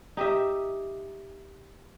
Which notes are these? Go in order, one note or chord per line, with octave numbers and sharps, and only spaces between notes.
D#4 G4 D#5 E5